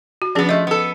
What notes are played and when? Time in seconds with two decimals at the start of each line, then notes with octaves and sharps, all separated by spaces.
0.22 F#4
0.35 F3 B3 C#4 D4 G#4
0.49 F3 A3 D#5
0.67 B3 A4